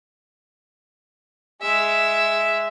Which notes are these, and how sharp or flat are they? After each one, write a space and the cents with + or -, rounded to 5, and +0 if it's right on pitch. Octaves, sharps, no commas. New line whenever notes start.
G#3 +5 E5 +0